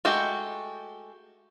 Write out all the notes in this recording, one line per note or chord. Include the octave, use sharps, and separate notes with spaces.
G#3 A3 F#4 G4